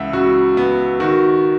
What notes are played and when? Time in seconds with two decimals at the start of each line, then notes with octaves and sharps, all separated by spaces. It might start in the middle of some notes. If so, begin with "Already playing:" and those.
Already playing: C#2 E3 E5 F#5
0.13 C#3 F#4
0.57 B3
1.00 D#3 F#4